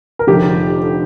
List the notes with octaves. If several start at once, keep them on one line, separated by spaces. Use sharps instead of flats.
A#4
F1 F2 D3 F3 G4